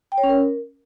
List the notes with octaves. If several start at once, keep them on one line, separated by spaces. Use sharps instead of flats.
G5
C#5
C#4
A#4